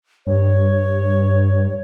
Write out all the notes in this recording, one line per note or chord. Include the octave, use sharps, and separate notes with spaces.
G2 C#5